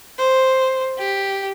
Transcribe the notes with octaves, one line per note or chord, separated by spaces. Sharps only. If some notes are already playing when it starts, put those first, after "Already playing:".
C5
G4